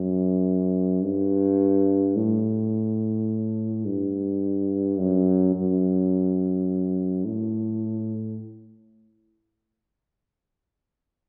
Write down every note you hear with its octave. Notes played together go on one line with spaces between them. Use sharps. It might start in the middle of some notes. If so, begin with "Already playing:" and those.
Already playing: F#2
G2
A2
G2
F#2
F#2
A2